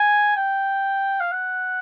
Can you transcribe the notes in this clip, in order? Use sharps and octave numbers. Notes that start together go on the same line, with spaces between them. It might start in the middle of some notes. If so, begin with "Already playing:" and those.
Already playing: G#5
G5
F5
F#5